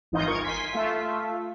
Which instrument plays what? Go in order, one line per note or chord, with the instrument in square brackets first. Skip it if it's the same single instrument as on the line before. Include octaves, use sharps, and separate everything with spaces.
[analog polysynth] G#1 E3 D#4 F4 D#5 G6
G1 A#4 C#6 G#6
G#5 C6 B6
A3 F4 E5